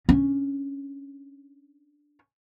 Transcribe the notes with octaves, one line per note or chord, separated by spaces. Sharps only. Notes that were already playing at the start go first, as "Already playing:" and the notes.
C#4 D4